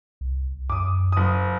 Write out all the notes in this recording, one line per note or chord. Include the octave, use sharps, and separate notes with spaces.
C2
F#2 D6 D#6
F#1 D#6